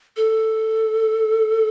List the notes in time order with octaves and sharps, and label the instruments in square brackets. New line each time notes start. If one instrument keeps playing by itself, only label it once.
[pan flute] A4